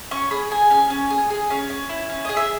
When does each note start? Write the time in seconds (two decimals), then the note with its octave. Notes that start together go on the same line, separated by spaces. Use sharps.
0.11 C#4 C#6
0.31 G#4 B5
0.51 G#4 G#5
0.71 C#4 G#5
0.90 C#4
1.10 G#4
1.30 G#4
1.50 C#4
1.70 C#4
1.89 E4
2.10 C#4
2.25 G#4 D#5
2.37 E5